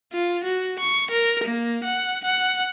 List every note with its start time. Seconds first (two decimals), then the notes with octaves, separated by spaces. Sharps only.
0.13 F4
0.44 F#4
0.80 C#6
1.11 A#4
1.44 A#3
1.84 F#5
2.25 F#5